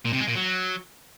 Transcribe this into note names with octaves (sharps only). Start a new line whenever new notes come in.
A#2
C3
G#3
A#2
F#3